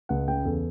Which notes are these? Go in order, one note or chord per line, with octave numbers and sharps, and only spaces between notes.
C#2 F#5
C#3 G5
E2 A4